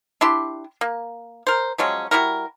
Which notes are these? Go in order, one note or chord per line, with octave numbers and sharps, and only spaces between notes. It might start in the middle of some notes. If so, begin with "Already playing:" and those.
D4 E4 G4 C6
A#3
A#4 C5
F3 F#3 G#3 C#4
G3 E4 F#4 A#4